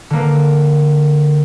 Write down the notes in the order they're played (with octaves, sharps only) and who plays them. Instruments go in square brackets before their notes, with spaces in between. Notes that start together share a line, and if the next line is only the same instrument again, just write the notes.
[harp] D3 A#3